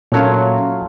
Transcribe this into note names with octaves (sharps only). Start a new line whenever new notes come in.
A#2 F#3 A3 A#3 C#4 F4 C#5